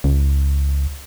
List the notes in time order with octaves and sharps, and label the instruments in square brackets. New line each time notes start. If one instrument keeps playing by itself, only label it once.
[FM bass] C#2